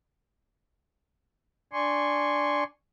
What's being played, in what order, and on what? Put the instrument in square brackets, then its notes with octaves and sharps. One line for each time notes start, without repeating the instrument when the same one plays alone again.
[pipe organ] D4 D5 G#5 C6 C#6